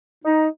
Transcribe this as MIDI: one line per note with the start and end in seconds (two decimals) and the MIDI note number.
0.24 0.46 63